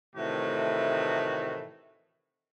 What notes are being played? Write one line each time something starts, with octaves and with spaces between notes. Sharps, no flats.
A2 C3 D#3 E3 A3 F#4